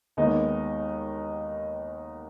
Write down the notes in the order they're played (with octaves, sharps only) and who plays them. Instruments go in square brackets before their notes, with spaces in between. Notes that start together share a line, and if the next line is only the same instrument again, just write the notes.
[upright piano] D#2 D#3 G#3 B3 D#4